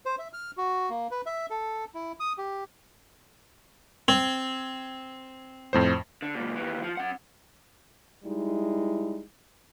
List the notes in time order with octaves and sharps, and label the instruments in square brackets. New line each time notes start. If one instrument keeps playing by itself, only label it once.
[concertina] C5
E5
F6
F#4
A#3
B4
E5
A4
E4
D#6
G4
[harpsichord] C4 [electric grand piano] G#6
[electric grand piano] F2 A2 C5
[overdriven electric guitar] D3
C#2 A#2
D#2 E3
F3
C#4 F#5
[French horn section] G3 G#3 D#4 E4